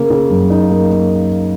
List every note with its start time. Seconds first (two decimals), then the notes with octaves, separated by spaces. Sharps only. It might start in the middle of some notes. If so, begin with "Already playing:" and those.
Already playing: C#3 A#3
0.10 C#3
0.30 F#2
0.50 D#4
0.70 A#3
0.91 A#3